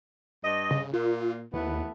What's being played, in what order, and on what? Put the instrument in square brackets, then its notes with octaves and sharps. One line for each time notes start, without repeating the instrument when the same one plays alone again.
[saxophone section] G2 D#5
[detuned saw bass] C#3
[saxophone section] A#2 [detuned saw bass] F4
[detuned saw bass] D#2 [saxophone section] E3 A3 B3